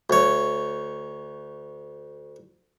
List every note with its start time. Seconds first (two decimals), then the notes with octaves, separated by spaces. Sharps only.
0.10 D2 C#5